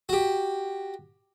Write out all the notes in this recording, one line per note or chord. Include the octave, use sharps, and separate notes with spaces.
F#4 G4